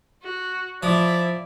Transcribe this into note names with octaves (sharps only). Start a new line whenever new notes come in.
F#4
F3 E4 D5